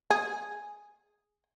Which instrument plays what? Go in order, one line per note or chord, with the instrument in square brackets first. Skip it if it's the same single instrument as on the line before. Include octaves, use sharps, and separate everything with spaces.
[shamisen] G#4